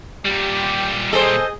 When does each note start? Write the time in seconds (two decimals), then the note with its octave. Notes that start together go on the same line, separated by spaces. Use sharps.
0.25 A#2 G3 G4
1.13 G#4 A4 C5 D#5